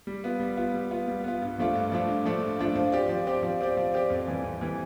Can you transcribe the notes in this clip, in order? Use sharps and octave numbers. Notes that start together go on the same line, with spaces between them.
G3
B3 F4
G3
B3 F4
G3
B3 F4
G3
B3 F4
G2
F3 A3 D4 F4
G2
F3 A3 D4 F4
G2
F3 A3 D4 F4
G2
F3 A3 D4 F4
F3
C4 G4 D5
F3
C4 G4 D5
F3
C4 G4 D5
F3
C4 G4 D5
F2
E3 G3
F2
E3 G3